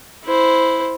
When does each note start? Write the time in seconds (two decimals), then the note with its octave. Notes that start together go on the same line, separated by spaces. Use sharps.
0.25 E4 C5